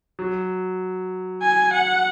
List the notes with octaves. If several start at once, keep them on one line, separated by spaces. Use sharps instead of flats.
F#3
G#5
F#5